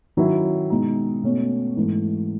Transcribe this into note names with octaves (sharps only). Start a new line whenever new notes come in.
D#3 F#3 C#4 E4
B2 G#3 D#4
B2 A3 C#4
G#2 E3 A3